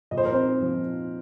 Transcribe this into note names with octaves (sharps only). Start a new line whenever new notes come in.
A#2 F3 D#5
C5
A#4
C4 C5
A#2 F3